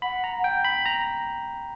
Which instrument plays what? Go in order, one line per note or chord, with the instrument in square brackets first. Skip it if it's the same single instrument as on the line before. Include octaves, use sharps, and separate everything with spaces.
[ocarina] F#5 [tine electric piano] B5
[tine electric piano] A#5
G5
B5
A#5